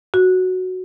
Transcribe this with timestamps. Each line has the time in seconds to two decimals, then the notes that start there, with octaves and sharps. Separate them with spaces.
0.14 F#4